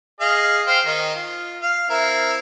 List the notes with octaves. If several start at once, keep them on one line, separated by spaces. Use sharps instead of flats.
G#4 D#5 F5
C5 F5 G5
D#3 D#4
F4
F5
C4 E4 A#4